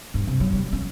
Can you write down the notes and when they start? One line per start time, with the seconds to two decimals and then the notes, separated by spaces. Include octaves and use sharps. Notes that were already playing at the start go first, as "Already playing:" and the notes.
0.14 G2
0.27 C3
0.40 F#3
0.53 G3
0.73 C#4